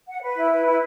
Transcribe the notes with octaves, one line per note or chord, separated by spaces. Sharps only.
F#5
B4
E4
B4
E4